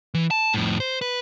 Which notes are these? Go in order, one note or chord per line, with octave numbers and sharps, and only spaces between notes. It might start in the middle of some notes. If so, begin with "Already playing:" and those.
E3
A5
F2 A2
C5
B4